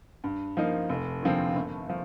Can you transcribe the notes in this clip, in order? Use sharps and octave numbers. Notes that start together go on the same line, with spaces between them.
G2
F3 A#3 D#4
F1
D#2 D3 F3 C4
G1
F3